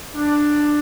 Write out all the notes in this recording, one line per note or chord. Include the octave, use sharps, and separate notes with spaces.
D4